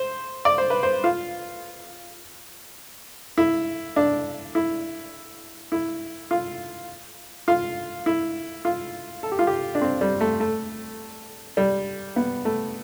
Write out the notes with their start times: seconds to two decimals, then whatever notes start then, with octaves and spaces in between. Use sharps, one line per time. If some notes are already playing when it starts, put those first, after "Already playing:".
Already playing: C5
0.45 D5
0.58 C5
0.70 B4
0.83 C5
1.04 F4
3.38 E4
3.96 D4
4.55 E4
5.72 E4
6.31 F4
7.48 F4
8.06 E4
8.65 F4
9.23 A4
9.32 G4
9.39 F4
9.47 G4
9.75 D4
9.81 C4
10.01 G3
10.21 A3
10.40 A3
11.57 G3
12.16 B3
12.45 A3